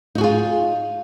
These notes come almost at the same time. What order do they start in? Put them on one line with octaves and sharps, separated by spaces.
D#4 F#4 G#4 F4